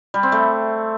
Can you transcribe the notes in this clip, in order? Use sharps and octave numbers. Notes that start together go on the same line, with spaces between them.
G3
C4
A3